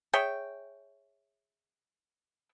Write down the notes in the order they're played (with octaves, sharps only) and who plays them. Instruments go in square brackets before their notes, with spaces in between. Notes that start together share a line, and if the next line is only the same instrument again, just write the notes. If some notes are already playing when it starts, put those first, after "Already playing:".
[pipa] G#4 C#5 E5 G5